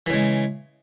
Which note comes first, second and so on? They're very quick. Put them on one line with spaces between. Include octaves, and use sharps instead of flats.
E3 C#3 G#3